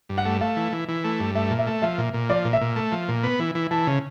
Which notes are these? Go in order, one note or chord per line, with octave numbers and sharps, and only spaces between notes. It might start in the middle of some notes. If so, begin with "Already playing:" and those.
G2
F#5
A3
A3 F5
E3
E3
E3
A3
G2
A3 E5
A#2
E5
A3
F3 E5
A#2
A#2
F3 D5
A#2
E5
A#2
A3
F3
A#2
B3
E3
E3
E3 A5
C#3